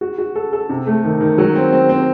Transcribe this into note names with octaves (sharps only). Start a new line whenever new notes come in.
F#4
F#4
A4
A4
C3
A3
D#3
D#3
F#3
C4
C4
C4